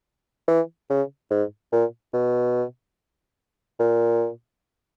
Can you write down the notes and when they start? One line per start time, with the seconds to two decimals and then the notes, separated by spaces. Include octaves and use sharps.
0.48 E3
0.90 C#3
1.31 G#2
1.72 A#2
2.13 B2
3.80 A#2